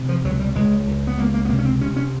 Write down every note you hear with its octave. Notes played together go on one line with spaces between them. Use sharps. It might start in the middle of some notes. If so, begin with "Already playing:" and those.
Already playing: C3
F3
C#2 F#3
G3
C#2 G#3
C#2
B3
C#2 A#3
A#3
B3
C3 A#3
C#4
C4
C3 C#4
C#4